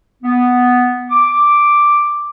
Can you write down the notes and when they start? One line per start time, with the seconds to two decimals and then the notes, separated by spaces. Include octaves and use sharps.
0.23 B3
1.10 D6